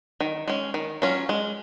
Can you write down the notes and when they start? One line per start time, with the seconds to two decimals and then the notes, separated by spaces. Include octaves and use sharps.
0.20 D#3
0.48 G#3 C#4
0.74 D#3
1.02 F#3 C#4 F4
1.29 G#3